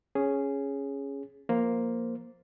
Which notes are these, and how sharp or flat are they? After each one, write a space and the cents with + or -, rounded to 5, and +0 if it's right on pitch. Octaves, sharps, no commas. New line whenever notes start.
C#4 +0 G#4 +0
F3 +0 A#3 +0 C5 +0